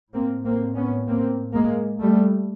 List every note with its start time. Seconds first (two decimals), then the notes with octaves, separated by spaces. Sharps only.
0.14 A2 A#3 C4
0.45 A#3 C4
0.76 B3 C#4
1.07 A#3 C4
1.54 G#3 A#3
2.01 G3 A3